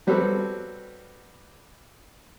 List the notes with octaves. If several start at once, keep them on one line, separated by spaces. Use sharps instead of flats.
F#3 G3 B3 C4 A4 B4